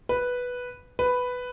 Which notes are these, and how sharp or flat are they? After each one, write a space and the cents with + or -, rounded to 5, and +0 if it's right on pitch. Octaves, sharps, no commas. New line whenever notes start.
B4 -5
B4 +5